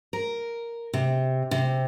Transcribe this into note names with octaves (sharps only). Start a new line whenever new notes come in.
A#4
C3
C3